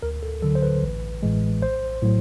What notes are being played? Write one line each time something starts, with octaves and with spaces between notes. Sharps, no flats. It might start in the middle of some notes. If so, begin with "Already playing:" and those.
D2 A#4
A4
D3 F#3 A4
C5
B4
A1
A2 E3 G#3
A#1 C5
A2 F#3